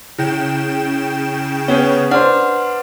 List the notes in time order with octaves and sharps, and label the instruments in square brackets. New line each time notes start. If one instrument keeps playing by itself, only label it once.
[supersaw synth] C#3 G5 E7 [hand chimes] E4
[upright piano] B3 C#4 G#4 [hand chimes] C#5
[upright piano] D4 C5 [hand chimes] B4 F#5 F6